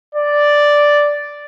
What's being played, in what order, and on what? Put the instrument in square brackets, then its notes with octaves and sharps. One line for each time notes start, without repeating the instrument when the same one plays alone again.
[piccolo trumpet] D5